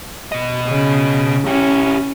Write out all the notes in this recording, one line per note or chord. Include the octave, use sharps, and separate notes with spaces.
B2 D#5
C#3
C#4 E4 G4